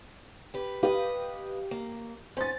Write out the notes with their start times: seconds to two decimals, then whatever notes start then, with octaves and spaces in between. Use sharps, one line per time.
0.54 G4 B4
0.83 G4 B4 D#5 F5
1.71 A#3
2.37 C#4 C5 A6